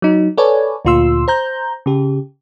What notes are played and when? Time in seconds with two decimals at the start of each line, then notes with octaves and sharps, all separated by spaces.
0.02 F#3 D#4
0.37 A4 B4 C#5 D5 G#5
0.85 D2 A#2 F4 C6 E6
1.28 C5 A#5 G6
1.86 C#3 G4